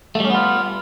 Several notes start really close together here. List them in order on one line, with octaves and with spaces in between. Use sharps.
A3 G3 C#4 B3 F4